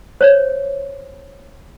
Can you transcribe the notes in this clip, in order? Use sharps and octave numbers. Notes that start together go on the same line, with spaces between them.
C5 C#5